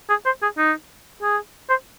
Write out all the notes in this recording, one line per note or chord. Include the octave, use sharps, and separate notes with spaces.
G#4
C5
G#4
D#4
G#4
C5